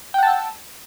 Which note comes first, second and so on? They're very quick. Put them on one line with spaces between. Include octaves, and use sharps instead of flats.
G5 F#5 A5 E6